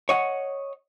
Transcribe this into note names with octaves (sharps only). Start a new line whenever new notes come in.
C#5 D#5 F#5